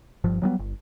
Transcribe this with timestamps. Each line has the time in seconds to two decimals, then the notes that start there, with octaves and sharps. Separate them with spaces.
0.24 G1 G2 F3
0.42 F#3 G3 A3 B3
0.59 G1